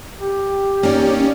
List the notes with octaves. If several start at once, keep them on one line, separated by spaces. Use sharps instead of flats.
G4
A#3 C#4 D#4 D5